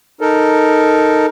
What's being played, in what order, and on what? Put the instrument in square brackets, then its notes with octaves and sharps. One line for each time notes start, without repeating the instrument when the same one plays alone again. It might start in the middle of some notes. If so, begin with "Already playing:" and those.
[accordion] D#4 A4 A#4